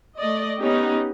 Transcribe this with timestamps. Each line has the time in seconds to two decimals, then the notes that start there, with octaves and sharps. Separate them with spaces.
0.18 A3 D5 D#5
0.59 B3 C#4 D#4 G4